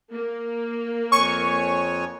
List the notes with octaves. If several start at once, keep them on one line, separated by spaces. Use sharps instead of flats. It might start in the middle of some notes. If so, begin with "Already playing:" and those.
A#3
F2 C#5 G#5 C#6